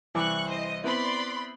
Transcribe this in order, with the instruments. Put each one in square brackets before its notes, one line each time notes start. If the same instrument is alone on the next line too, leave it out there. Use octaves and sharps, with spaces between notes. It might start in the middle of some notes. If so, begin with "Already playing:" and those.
[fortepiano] C2 E3 D6 [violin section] C#6 F#6
[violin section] C5 D#5
[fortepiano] B3 C4 E4 [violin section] D5 B5 C6